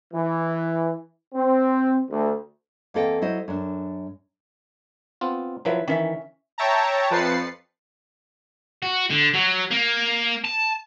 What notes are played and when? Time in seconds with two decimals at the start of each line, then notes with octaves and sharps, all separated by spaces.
0.14 E3
1.34 C4
2.11 D2
2.94 E2 A#3 C4 A4 D#5 G5
3.22 F#3 E4 C5 D#5
3.48 F#2 D4
5.21 B3 C4 F4
5.65 F3 F#3 E4 B4 E5
5.88 D#3 E3 C#4 E5
6.58 C#5 E5 G5 A5 A#5
7.10 F2 F3 B4 A6 C7 C#7
8.82 F#4
9.10 D3
9.34 F#3
9.71 A#3
10.45 A5